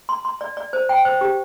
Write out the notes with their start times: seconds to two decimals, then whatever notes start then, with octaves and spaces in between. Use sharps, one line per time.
0.09 C6
0.25 C6
0.41 D5
0.57 D5
0.73 C5
0.89 G5
1.05 C5
1.21 G4